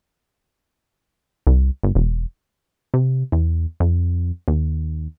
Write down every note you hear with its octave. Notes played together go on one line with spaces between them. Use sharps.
C2
G1
E1
C3
E2
F2
D#2